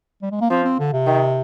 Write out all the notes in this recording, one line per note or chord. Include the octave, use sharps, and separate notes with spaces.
G3
G#3
A#3
F3 C4
C4
D3
C3
D#3